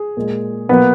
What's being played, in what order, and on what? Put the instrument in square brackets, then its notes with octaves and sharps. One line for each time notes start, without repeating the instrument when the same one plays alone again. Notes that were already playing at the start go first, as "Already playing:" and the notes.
Already playing: [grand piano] G#4
A#2 G#3
B2 F#3 A#3 B3 B4